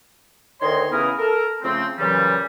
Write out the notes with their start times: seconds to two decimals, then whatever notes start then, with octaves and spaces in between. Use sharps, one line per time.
0.61 D2 D#3 C#5 D#5 C6
0.91 C#3 E3 B3 E4 G#4 A#4
1.18 A4 A#4
1.62 C#3 F3 A3 C4
1.98 A#2 C#3 E3 F#3 G3